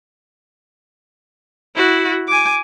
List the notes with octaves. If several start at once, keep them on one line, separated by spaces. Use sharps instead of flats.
E4 F#4
G#5 D6